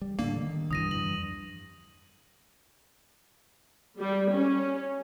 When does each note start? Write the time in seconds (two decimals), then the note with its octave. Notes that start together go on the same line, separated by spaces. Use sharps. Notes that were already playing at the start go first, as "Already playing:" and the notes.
0.02 G3
0.19 A2 D3 E3 G3 A#3 D4
0.36 D3 D#3
0.71 C2 G2 D3 E3 D#6 A#6 D#7
0.91 F2 D3 E3 F#7
3.99 G3
4.33 C#4